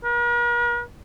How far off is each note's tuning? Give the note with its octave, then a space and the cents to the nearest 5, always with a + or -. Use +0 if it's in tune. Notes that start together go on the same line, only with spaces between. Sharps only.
A#4 +45